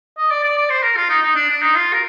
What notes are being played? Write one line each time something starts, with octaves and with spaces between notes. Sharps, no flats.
D#5
D5
D5
D5
C5
A#4
F4
D#4
D#4
D4
D4
D#4
F4
A#4